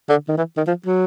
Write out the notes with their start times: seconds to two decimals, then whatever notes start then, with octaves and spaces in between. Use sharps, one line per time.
0.10 D3
0.29 D#3
0.38 E3
0.57 D#3
0.67 F3
0.86 F#3